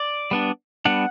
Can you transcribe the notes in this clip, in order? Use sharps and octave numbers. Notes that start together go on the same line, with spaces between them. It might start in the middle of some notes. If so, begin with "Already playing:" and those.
Already playing: D5
G3 B3 D4
G3 B3 D4 F#5